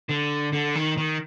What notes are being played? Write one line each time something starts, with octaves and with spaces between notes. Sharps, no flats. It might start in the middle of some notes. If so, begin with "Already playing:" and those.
D3
D3
D#3
D#3